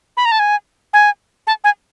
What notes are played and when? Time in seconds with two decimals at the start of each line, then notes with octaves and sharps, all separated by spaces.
0.17 B5
0.25 A#5
0.32 A5
0.39 G#5
0.93 G#5
1.47 A5
1.64 G#5